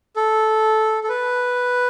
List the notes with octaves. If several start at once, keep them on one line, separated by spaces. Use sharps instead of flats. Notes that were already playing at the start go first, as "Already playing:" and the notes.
A4
A4
B4